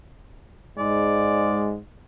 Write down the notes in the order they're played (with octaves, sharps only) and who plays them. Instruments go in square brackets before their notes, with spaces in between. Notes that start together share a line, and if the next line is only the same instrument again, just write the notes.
[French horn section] G#2 G#3 [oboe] D5